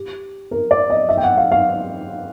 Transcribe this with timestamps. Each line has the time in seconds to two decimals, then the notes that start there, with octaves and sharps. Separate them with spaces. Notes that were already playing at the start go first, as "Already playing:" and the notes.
Already playing: G4
0.51 A#4
0.71 D5
0.90 D#5
1.09 E5
1.17 G5
1.23 F#5
1.37 F5
1.52 F5